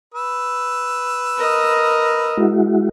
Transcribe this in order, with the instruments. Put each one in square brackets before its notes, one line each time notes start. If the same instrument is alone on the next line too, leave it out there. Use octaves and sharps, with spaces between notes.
[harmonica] B4 E6
[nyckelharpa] A#4 D#5
[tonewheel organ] G#3 E4 F#4